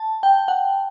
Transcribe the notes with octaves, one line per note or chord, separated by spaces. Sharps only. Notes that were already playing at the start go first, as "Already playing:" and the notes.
Already playing: A5
G5
F#5